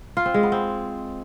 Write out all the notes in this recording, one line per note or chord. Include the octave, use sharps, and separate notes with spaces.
F4
C4
G#3
B3
C4